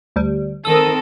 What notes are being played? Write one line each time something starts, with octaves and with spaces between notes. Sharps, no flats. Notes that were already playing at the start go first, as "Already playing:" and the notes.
D2 G3
D#3 C4 A4 A#4 D#6 E6